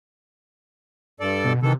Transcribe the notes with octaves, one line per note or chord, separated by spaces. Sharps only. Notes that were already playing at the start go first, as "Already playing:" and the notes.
G2 A4 D5
B2
C3 D#3 E3 A4